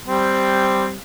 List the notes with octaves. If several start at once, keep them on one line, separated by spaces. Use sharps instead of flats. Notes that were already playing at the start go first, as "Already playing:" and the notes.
G3 C4